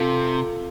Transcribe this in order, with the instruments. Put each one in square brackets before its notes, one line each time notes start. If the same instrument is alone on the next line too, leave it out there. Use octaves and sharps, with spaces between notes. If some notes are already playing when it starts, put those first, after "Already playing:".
Already playing: [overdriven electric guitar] C3 [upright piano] F4 A4